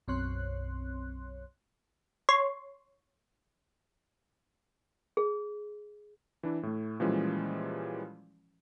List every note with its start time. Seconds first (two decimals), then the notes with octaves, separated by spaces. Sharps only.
0.08 B1 F#2 C4 C#5 C6 F#6
2.29 C#5 C6
5.17 G#4
6.43 E3 D4 E4
6.63 A2 A3
7.00 A#2 E3 F3 G3 G#3 C#4